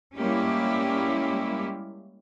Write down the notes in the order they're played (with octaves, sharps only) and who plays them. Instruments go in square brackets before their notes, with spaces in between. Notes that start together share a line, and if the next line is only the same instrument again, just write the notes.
[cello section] G3 G#3 A#3 C#4 E4 G4